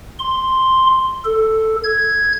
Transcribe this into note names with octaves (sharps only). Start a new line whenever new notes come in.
C6
A4
G#6